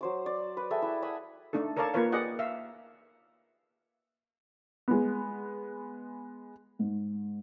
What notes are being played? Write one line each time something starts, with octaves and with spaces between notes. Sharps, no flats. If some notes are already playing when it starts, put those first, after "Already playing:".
F#3 C5 D6
D5
B4
G#4 A4 E5 G5
E4 E5
F#5 G#5 B5 D#6
A3 D4 D#4 A4
A4 A#4 C#5 D5 F5 A5
A#3 F4 A#4 B4 C#5 F5
G4 G#4 B4 D5 D#5 F#5
E5 F5
G#3 B3
G#2